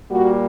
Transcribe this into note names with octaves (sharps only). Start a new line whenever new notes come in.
A#2 G3 A#3 F#4